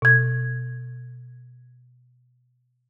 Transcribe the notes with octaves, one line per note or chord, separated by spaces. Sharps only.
B2 G#6